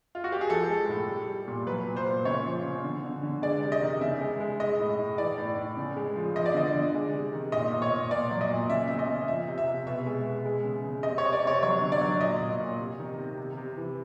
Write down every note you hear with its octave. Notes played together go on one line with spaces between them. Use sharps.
F4
F#4
G4
G#4
F3 A4
G#3
A2
G3
G3
A#2
F#3 B4
A#2
C5
A#2
C#3 C#5
F3
C#3
D3
D3
D3
G#3 D5
C3
D#5
D#3
C#3 E5
G#3
G#3
G#3 D#5
A2
A2
E3 D5
A2
A2
C#3
G#3
F3
F3 D#5
D5
D3 D#5
D3
G#3
C3
D#3
A#2 D#5
A#2
C#5
A#2
A#2 D5
F#3
D#5
A#2
C#3 E5
C#3 E5
D#5
C#3
F3 E5
C3
E5
C3
B2 E5
G#3
B2
G#3
C#3
C#3
C3 D#5
C#5
C3
D5
C3 C#5
F#3 C#5
D3
D5
F#3
A#2 D#5
A#2
A#2
C3
D#3
C3
C3
C3
E3